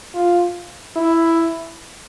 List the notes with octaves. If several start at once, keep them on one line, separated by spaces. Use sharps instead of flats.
F4
E4